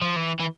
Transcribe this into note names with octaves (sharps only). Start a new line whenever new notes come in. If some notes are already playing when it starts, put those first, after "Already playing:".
F3
E3
E3